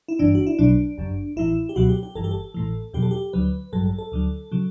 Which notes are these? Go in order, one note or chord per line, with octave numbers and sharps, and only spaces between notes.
E4
G1 G2 E3 D4
F#4
E4
B1 B2 F#3 D4
G1 F#2 C#3
A1 A2 E3 E4
G4
C#2 B2 F#3 F#4
G4
G4
G1 G2 E3 A4
G4
A4
A1 A2 E3
E2 B2 F#3 G4
A4
G4
D2 D3 F#3 B4
A1 G2 F#3 A4
A4
A4
D2 D3 F#3
C#3 F#3